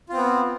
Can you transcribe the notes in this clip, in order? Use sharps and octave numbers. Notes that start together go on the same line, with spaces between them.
B3 C4 F4